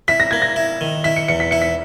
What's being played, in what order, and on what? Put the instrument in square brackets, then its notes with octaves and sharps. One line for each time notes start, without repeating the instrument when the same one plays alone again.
[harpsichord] E4 [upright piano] B6
[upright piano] A#6
[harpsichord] A#3 [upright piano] G#6
[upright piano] A#6
[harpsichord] E4
D#3
[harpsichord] E4 [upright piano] B6
[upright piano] C#7
[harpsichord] E2 [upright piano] C#7
[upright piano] B6
[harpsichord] E4 [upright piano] C#7
[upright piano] B6